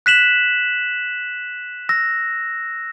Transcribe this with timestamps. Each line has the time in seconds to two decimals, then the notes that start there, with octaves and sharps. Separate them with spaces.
0.06 F#6 B6 E7 F#7
1.89 E6 A#6